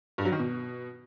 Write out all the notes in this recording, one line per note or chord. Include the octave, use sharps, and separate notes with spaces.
G2
F#3
D#3
B2